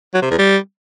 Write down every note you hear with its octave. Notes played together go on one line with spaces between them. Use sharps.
F#3
C3
E2
G3